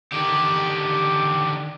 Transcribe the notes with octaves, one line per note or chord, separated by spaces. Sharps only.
D3 D#3 G4